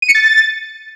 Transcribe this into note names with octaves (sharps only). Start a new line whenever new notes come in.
D#7
C#7
A6